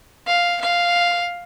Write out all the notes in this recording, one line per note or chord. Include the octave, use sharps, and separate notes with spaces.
F5
F5